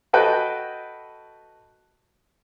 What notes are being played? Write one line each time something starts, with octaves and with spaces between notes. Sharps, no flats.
F#4 A4 B4 D#5 G5